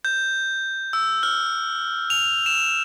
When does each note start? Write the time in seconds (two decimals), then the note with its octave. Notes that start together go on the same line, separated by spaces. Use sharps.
0.05 G6
0.93 E6
1.23 F6
2.10 F7
2.46 E7